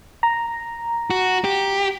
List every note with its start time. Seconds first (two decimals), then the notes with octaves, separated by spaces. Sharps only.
0.23 A#5
1.10 F#4
1.44 G4